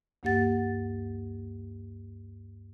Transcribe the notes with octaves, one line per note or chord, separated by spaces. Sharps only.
D2 G2 A#3 G4 F#5 A6